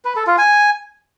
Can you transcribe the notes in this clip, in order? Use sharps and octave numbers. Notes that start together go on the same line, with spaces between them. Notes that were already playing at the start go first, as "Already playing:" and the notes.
B4
A4
F4
G#5